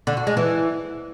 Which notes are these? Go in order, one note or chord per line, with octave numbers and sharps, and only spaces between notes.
D3
F#4
G#3
E3